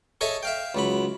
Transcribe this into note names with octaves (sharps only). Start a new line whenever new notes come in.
G#4 A4 C#5 D#5 E5
E5 F5 G5
C#2 F#3 B5